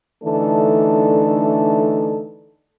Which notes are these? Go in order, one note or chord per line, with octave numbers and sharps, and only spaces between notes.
D3 E3 A3 D4 D#4 A4